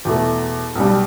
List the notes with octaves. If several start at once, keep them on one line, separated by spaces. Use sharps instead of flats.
E2 B2 A3
B1 B2 G3